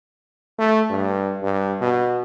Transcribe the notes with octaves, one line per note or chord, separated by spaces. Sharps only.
A3
G2
G2
B2